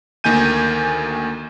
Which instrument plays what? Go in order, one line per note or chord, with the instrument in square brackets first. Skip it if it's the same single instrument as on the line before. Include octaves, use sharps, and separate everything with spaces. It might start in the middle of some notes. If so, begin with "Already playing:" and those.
[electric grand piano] D2 D#3 A#3 G#5 G6 D#7